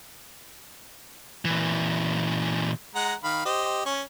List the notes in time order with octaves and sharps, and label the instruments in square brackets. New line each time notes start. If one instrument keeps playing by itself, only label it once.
[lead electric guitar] A#2 E3
[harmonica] G#3 F#5 A#5
D#3 F5 B5
G4 C5 D#5
C#4 C#6